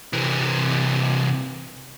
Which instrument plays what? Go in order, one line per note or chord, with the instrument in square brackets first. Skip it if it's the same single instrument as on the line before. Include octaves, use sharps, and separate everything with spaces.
[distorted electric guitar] C3 E3